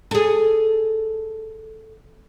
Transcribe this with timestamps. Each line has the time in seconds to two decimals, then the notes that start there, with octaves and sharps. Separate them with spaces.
0.11 G#4 A4